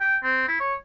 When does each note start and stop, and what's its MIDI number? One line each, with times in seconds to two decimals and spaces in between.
0.01 0.16 79
0.23 0.44 60
0.48 0.60 64
0.60 0.75 73